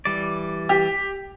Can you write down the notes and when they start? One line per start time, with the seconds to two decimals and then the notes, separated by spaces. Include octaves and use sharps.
0.05 E3 G3 D5
0.69 G4